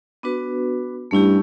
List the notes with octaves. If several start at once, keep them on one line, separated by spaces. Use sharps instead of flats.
B3 D4 F#4 B4
G2 A3 C#4 E4 G4